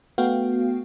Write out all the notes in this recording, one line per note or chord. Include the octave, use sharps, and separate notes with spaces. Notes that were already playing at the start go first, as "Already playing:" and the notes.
A3 B3 F#4 F5 G5